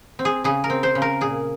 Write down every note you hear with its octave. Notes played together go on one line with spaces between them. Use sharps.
C4
G#4
C#3 G#4
A#4
C4
C5
C#3
A#4
A#2 G#4